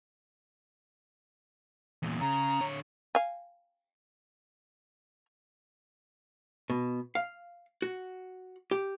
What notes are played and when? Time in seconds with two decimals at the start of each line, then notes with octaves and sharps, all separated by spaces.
2.03 E2 A#2
2.21 C#3 A#5
2.60 D3 C#5
3.15 F5 G#5
6.70 B2
7.15 F5
7.82 F#4
8.71 G4